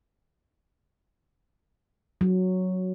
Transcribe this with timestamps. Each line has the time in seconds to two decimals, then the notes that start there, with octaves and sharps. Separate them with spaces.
2.21 F#3